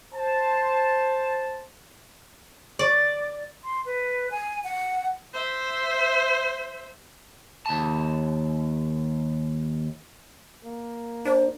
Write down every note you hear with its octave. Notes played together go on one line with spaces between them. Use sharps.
C5 A5
D5
C6
B4
G#5
F#5
C5 E5
D#2 A5
A#3
D4 C5